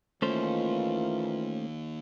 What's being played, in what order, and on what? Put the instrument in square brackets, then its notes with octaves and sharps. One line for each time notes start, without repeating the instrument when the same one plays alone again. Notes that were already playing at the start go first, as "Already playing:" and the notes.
[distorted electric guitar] D#2 [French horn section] E3 A#3 F4 [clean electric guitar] A3 C#4 C5